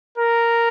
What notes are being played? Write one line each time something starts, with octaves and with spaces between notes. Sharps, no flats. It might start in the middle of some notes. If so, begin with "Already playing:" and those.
A#4